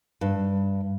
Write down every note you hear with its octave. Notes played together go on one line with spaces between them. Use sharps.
G2